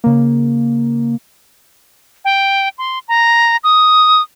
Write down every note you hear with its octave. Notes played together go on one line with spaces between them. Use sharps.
C#3 A#3
G5
C6
A#5
D#6